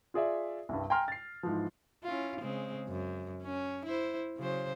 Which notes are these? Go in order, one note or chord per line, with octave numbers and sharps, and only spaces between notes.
F4 G#4 D5 E5
C2 G2
G5 G#5 A#5 C6 F6
A6 C7
G#2 E3 F3
C#4 E4 F4
C#3 G#3 C4
F#2
C#4
E4 C5
C#3 F#3 C5